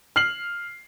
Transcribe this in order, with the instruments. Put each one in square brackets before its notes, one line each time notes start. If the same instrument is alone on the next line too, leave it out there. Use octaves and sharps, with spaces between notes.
[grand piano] F6 C7 F#7